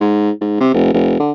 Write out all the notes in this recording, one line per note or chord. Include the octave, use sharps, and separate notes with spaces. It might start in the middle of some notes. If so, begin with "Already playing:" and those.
G#2
G#2
C3
F1
F1
D3